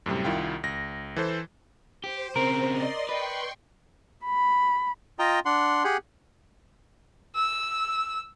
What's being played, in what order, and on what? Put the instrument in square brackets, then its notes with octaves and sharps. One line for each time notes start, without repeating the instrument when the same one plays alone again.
[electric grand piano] F#2 A2 C3 G3
C2 D#3 E4 F4 G5
C#2 A#6
E3 A4 C5
[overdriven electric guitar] G4 [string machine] C5
[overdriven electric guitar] C#3 C4 [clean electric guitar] A#4
[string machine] D5 D#5 C6
[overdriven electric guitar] B4 [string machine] G5 C6 C#6
[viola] B5
[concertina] F4 D#5 G5 A#5
D4 F#5 C6
G4 G#4 F#5
[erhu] E6